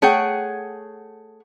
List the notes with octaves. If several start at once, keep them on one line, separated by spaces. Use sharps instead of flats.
A3 G#4 C#5 F#5 G5